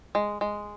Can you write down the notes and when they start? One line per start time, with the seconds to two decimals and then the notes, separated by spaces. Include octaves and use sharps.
0.15 G#3
0.41 G#3